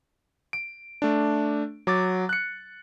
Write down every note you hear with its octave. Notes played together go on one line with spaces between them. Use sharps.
D7
A3 D4
F#3 D6 A6
F#6 C#7